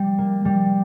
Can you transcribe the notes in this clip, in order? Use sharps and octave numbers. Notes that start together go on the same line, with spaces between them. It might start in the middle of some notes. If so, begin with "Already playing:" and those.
Already playing: G3
A#3
G3